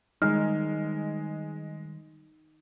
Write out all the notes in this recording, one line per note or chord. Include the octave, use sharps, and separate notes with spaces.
D#3 G3 G#3 D#4 F6